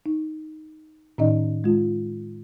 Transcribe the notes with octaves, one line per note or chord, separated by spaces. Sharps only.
D#4
A2 D#3 C#4 D#4 D5 D#5
G#3 F4